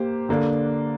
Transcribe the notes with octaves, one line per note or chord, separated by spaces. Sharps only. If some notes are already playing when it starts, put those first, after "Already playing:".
Already playing: A#3 G4 C5
D3 A#3 D4